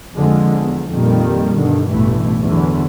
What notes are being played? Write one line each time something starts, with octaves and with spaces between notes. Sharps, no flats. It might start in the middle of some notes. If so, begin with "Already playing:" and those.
F2 D3 F3 G#3
E2
F2 A#2 D#3 G3
G2 B2 D3 D#3
A1 G2 B2 E3 A3
E2 D3 E3 F#3